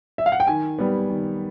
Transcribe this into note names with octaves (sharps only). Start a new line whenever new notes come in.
E5
F5
F#5
G5
D#3 G#5
G3 B3
D#3